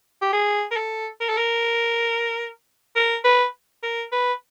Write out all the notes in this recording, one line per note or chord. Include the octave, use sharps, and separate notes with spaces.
G4
G#4
A#4
A4
A#4
A4
A#4
A#4
B4
A#4
B4